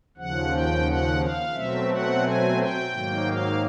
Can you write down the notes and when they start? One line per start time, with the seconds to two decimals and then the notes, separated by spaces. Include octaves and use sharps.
0.17 D#2 C#3 F3 F#5
0.52 G5
0.86 F#5
1.20 F5
1.54 B2 F#3 A3 C4 E5
1.89 F#5
2.23 G#5
2.58 G5
2.91 G#2 D#3 F#3 A#3
3.26 F5